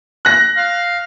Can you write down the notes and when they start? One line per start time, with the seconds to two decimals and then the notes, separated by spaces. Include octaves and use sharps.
0.25 F#6 A#6
0.57 F5